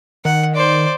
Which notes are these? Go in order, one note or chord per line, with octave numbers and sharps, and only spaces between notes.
D#3 F#5
C5 D5